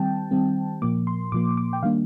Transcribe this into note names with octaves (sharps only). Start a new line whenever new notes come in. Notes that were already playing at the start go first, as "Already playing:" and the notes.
Already playing: D#3 G3 C4 G5 A5
D#3 G3 C4
A#2 F3 A#3 D6
C6
A#2 F3 A#3 D6
D6
G5
D#3 G3 A#3 D4 F5